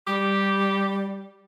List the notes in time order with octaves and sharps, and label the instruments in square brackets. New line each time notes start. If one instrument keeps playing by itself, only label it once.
[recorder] G3 [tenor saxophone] G4